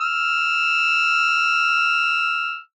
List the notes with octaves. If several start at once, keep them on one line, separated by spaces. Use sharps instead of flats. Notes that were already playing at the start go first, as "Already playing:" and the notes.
E6 F6